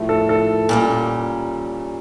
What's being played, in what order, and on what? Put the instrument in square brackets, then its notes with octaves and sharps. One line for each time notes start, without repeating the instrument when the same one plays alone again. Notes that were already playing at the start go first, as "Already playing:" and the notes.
Already playing: [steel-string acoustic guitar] A2 F3 A3
[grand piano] A4
A4
[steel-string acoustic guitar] A#2 G3 C#4